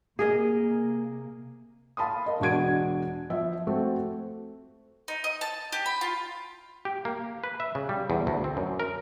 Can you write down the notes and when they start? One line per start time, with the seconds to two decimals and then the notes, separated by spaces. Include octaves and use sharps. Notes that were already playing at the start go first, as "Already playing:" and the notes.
0.19 C3 A#3 G#4 A#4 D#5
1.97 F5 A5 B5 C6 D#6
2.26 A#4 D#5
2.40 E1 D4 F#4 G#6 D7
3.30 F3 E5
3.67 A3 C4 F#4 A4
5.08 D#4
5.24 D#5
5.41 A5
5.72 G4
5.86 B5
6.01 F4
6.85 G4
7.05 A#3
7.44 B4
7.60 E5
7.75 C#3
7.89 G3
8.10 E2
8.27 D2
8.44 C4
8.57 F#2
8.80 A#4